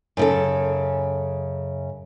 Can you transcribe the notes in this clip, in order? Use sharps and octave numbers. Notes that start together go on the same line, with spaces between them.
F#2 C#3 A4